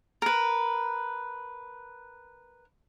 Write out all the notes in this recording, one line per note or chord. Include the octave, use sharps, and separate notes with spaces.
A#4 B4